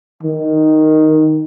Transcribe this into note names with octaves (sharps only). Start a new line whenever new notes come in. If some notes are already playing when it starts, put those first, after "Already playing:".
D#3